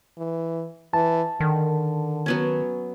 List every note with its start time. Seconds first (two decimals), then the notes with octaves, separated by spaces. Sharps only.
0.18 E3
0.93 E3 A5
1.40 D3 D#3
2.26 F#3 B3 C#4